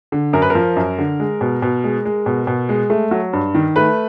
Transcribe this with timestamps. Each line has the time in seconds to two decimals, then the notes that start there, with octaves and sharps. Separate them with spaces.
0.12 D3
0.33 F#2 A#4
0.42 B4
0.50 A#4
0.55 F3
0.76 F#2
0.98 D3
1.20 G#3
1.41 B2
1.62 B2
1.84 G#3
2.05 G#3
2.26 B2
2.47 B2
2.69 G#3
2.90 A3
3.11 F#3
3.33 G2
3.54 D#3
3.76 A3 B4